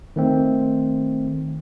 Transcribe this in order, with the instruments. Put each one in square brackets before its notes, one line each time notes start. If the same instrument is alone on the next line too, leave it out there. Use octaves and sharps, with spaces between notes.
[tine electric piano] D#3 A3 C4